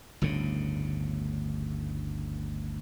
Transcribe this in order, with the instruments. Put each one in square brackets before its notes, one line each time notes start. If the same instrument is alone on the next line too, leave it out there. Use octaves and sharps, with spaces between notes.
[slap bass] G1 D2 A2 C#3